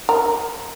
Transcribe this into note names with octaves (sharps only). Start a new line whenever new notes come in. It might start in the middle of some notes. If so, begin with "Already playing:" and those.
A#4